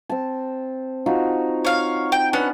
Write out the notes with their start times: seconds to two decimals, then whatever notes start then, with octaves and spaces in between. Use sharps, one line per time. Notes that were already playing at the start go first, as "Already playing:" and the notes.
0.10 C4 A5
1.06 D#4 F4 F#4
1.65 C#5 F5
2.12 G5
2.33 B3 C#4 D4 F#5